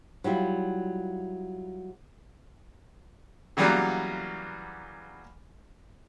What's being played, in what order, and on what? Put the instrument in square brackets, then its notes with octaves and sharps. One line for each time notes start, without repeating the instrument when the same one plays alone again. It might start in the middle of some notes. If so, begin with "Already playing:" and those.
[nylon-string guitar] F#3 G3 E4 F4
[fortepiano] C#3 E3 F#3 G3 A#3 B3